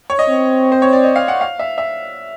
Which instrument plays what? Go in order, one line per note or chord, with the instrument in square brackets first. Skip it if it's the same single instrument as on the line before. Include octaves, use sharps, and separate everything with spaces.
[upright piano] C#5
D#5
[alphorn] C4
[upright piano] C5
C#5
D5
D#5
F5
F#5
F5
E5
E5